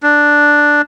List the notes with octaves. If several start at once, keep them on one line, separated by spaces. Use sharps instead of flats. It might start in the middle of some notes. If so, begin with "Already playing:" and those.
D4